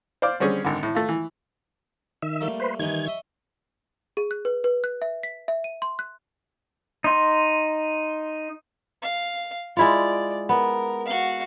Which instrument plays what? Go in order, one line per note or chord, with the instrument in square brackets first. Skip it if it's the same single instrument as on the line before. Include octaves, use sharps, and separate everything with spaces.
[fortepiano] C5 D5 F5 D6
D3 G3 C4 C#4 G#4
G#1 D3
A2
A3 F4
E3
[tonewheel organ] D#3 E5
[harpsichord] G3 A3 A#3
[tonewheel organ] B4 C5
[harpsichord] G2 E3 D#4 [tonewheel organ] D#3 G#6
[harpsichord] D#5 E5 C#6
[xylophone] G#4
F#6
B4
B4
F#6
E5
B6
E5
D#7
C6
F#6
[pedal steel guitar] D#4 C6
[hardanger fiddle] F5
[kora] G#3 E4 F4 [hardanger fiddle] D5
[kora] B3 [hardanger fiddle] A#4
[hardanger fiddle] F#4 F5